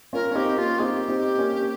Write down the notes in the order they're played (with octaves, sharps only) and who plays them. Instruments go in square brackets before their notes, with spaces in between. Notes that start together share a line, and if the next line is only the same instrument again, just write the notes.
[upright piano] C#4 F4 [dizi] A#4
[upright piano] C#4
[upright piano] C4 D#4 [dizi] G4
[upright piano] A#3 C#4 [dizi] F4
[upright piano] C4 D#4 [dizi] G4 G#4
[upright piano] C4 D#4
A#3 C#4